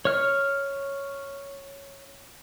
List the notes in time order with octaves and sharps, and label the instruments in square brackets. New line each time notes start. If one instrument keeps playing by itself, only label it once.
[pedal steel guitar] C#5 F6